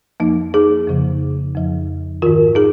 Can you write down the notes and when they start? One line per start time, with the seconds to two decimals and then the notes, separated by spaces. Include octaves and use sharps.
0.20 F2 F3 A#3 D#4
0.54 D#4 G#4
0.87 F2 C#3 F3
1.55 F2 F3
2.22 G#2 D#3 F4 A#4
2.55 D#4 G#4